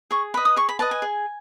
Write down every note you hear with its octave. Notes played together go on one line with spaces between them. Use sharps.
G#4 C#6
B4 D#5 B5
D#6
G#4 C#6
B5
B4 D#5 A5
G#5
G#4